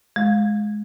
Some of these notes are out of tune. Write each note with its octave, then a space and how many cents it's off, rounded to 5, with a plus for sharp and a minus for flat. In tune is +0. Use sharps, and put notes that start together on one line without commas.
G#3 +15